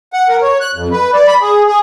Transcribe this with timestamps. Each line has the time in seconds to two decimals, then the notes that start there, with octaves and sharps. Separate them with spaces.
0.13 F#5
0.28 A#4
0.42 C#5
0.61 F#6
0.75 F2
0.92 B4
1.14 D5
1.27 B5
1.41 G#4
1.67 G#4